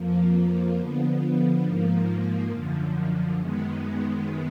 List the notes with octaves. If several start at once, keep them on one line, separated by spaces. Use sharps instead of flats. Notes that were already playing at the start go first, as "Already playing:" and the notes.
Already playing: F2 F3 A#3
D3 F3 B3
G#2 F3 A#3
F#2 D3 F3
F#2 D#3 G#3 B3